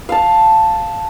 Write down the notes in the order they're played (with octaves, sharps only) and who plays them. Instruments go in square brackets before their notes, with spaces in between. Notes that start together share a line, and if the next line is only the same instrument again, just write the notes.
[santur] F5 A5